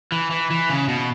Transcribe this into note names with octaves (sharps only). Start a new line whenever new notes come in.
E3
E3
E3
C#3
B2